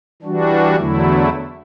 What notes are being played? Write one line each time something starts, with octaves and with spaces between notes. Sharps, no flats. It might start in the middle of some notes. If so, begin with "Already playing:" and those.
E3 G3 D4 F#4
E2 D3 F#3 A3 E4